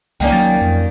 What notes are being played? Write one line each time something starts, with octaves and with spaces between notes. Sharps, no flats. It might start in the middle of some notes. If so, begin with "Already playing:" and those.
C#2 D#3 A#3 C#4 D5 G5
F#3 A6
F2